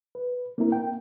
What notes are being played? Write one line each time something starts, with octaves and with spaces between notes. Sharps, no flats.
B4
A#3 C4 D4 E4 A#4
G5